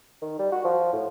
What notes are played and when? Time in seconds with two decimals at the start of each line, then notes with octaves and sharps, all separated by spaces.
0.22 D#3
0.39 G3
0.52 F#4
0.64 F3
0.93 A2